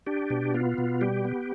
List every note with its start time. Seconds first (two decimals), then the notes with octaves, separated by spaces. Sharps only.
0.07 D4 G4
0.30 B2
0.54 B3 F4
0.78 B2
1.01 G3 G4
1.25 B3